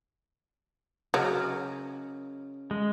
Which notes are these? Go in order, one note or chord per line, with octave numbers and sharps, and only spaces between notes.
C#3 F#3 A#4 D#5
G#3